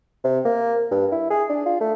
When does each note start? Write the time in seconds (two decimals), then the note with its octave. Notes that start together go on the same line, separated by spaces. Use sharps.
0.24 C3
0.45 A#3
0.91 G2
1.12 E4
1.30 G#4
1.49 D4
1.66 F4
1.81 A3